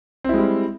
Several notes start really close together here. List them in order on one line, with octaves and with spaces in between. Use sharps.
C4 E4 G#3 G3